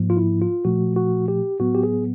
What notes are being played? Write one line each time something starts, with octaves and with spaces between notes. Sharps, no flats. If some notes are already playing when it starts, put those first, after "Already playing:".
Already playing: G#2 F3 A#3
F4
E4
F4
A#2 F3 A3 F#4
F#4
G4
A2 F#3 B3 F#4
G4
G#4